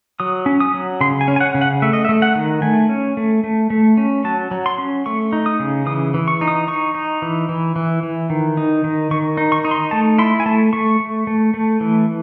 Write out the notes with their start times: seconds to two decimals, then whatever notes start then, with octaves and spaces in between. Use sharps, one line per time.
0.20 F#3 D#6
0.46 C#4
0.60 D#6
0.74 F#3
1.01 C#3 C6
1.21 G#5
1.28 C#4
1.36 G#5
1.41 F#5
1.54 C#3
1.61 F#5
1.82 A3 E5
1.93 D#5
2.05 E5
2.09 A3
2.22 F#5
2.35 D#3
2.62 A3 G#5
2.89 C#4
3.17 A3
3.44 A3
3.70 A3
3.97 C#4
4.24 F#3 A5
4.51 F#3
4.66 C6
4.78 C#4
5.06 A3 C#6
5.33 D#4
5.46 D#6
5.60 C#3
5.86 E3 D#6
6.14 E3
6.28 C#6
6.41 D#4
6.48 D#6
6.68 D#4 C#6
6.95 D#4
7.22 E3
7.49 E3
7.76 E3
8.03 E3
8.30 D#3
8.57 D#4
8.84 D#3
9.11 D#3 C#6
9.37 D#4
9.52 C#6
9.65 D#4
9.71 C6
9.91 A3 A5
10.18 E4 C6
10.40 G#5
10.46 A3 A5
10.73 A3 C#6
11.00 A3
11.27 A3
11.54 A3
11.80 E3